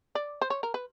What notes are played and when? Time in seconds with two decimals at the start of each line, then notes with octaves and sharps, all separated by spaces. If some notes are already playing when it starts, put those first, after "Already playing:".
0.15 D5
0.42 C5
0.50 C#5
0.63 A#4
0.74 B4